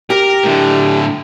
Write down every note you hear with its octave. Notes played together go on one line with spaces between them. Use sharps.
G4 A#4
A2 D3